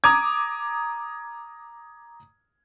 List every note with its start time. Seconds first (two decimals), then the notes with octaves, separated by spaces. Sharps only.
0.04 A#5 D6 D#6 G#6